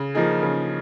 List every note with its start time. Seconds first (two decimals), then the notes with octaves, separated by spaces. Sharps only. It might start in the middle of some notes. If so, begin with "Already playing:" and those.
Already playing: C#3
0.15 F3 A#3 D#4 G#4
0.43 C#3